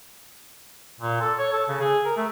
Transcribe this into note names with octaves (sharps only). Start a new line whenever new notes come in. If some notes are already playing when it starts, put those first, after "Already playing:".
A#2
A4
C#5
A4
C#3
G#4
A#4
A3